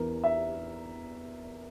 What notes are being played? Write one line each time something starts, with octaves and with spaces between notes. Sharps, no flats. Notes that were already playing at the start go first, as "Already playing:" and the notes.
Already playing: E2 E3 A#4
E5